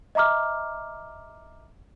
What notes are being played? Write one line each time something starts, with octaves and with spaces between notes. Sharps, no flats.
D#5 E5 A#5 D6 F6